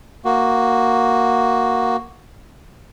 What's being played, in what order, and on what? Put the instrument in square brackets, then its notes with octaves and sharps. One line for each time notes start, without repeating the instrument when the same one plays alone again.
[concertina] A#3 F#4